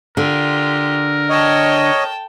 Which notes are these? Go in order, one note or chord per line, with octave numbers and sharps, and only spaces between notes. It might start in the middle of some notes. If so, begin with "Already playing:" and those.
D3 F4 G4 A#4
C#5 D#5 G5 A5